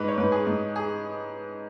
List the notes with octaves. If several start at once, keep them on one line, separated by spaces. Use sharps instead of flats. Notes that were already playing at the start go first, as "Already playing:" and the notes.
Already playing: G#2 B4
C#5
G#2 B4
G#4
G#2
G#4